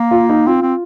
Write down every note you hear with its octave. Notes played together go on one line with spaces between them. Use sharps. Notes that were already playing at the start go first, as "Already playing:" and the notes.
Already playing: A#3
F4
D#4
C4 F4
C4